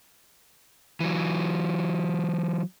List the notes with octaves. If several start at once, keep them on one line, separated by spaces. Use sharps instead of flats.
E3 F#3